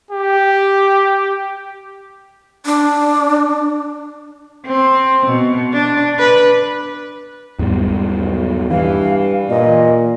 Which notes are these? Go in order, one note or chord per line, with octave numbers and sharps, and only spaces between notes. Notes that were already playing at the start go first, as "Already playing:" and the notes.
G4
D4
C4
B2
D4
B4
E2 G#2 G3
B1
G2 E3 F5
A#2 D#5